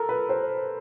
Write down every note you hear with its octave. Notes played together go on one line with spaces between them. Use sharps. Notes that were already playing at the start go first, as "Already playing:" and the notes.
Already playing: A4 A#4
B4
C5